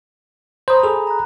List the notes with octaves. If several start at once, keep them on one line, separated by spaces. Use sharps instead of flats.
C5 A#5 B5 D#6
G#4 A4
A#5 B5 F#6